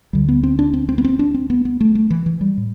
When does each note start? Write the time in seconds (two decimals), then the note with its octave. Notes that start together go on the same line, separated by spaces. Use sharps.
0.13 D2 D3 G3
0.29 B3
0.43 C4
0.59 D4
0.73 C4
0.89 C4
0.98 B3
1.04 C4
1.19 D4
1.34 C4
1.50 B3
1.65 B3
1.81 A3
1.95 A3
2.10 E3
2.26 E3
2.41 G3
2.57 A2